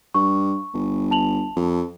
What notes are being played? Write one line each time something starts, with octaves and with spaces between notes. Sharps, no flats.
G2 C#6
G1
A5 F7 F#7
F2